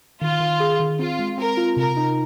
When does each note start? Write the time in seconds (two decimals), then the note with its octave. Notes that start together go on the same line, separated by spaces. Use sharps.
0.21 D#3 F4
0.40 D#3
0.60 G#4
0.80 D#3
0.99 C4 F4
1.19 G#3
1.38 C4 A#4
1.57 F4
1.77 C3 A#4
1.97 D#4